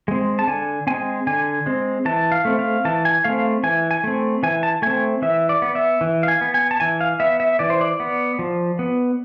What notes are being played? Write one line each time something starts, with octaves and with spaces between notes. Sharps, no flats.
G#3 C4
A5
D3 G#5
G#3 C4 G#5
D3 G#5
G#3 C4
E3 A5
F5
A3 C4
F5
E3 A5
G#5
A3 C4 F5
E3 G#5
G#5
A3 C4
E3 G#5
A5
A3 C4 G#5
E3 E5
D5
B3
E5
E3
F5
G#5
B3
G#5
A5
E3 G#5
F5
B3 E5
E5
E3 D5
C5
D5
B3
F3
B3